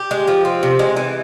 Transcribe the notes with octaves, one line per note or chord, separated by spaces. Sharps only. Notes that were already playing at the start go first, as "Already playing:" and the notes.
Already playing: G4
G#3
F3
C4
C3
G#3
E3